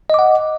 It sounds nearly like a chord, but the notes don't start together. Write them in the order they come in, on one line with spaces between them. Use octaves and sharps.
D#5 D6 F#5